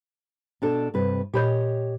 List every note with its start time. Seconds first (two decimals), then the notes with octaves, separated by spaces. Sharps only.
0.62 B2 D4 A4
0.94 G2 C3 B4
1.34 A#2 G4 C#5 D#5 B5 G6